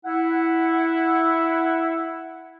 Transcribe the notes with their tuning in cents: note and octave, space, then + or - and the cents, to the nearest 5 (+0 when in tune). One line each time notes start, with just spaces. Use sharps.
E4 +0 F#5 +0